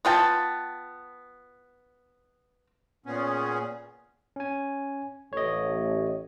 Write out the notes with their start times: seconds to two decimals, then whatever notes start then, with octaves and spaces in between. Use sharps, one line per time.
0.05 B3 F4 G5 A5
3.06 A#2 B3 C#4 G#4
4.36 C#4 G#5
5.33 A1 C#5 D#5